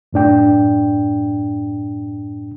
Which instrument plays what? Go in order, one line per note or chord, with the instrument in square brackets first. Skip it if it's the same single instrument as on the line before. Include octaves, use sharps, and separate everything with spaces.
[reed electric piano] F#2 A2 D4 G5